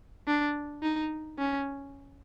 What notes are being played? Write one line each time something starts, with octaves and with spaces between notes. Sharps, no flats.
D4
D#4
C#4